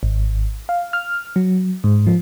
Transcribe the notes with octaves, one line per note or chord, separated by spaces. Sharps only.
G#1
F5
F6
F#3
G#2
F3